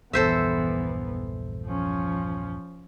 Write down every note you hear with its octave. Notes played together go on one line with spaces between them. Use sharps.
A#1 E2 G2 E3 B3 A4 C5 E5
F3 C#4